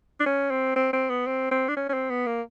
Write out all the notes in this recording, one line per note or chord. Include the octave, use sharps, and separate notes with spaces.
D4
C#4
C4
C4
C4
B3
C4
C4
D4
C#4
C#4
C4
B3
A#3